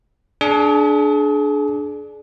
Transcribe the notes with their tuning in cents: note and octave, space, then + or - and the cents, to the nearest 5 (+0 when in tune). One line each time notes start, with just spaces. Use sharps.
D4 +0 G#4 +35 D5 +0